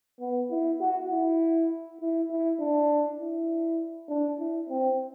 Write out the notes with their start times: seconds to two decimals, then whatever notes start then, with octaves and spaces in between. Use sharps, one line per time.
0.20 B3
0.51 E4
0.81 F#4
1.11 E4
2.01 E4
2.30 E4
2.60 D4
3.19 E4
4.09 D4
4.39 E4
4.69 C4